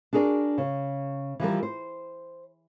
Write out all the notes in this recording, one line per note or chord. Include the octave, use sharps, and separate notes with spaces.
D4 F#4 G#4 A#4 D5
C#3
E3 F3 G3 A#4
C5